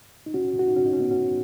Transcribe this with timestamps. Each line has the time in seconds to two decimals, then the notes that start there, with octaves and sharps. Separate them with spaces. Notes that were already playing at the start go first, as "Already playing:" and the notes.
0.26 D#4
0.34 C#4 F#4
0.59 F#4
0.68 D#4
0.76 C#4 F#4
0.86 D#4
0.93 C#4
1.00 B3 D#4
1.11 C#4 F#4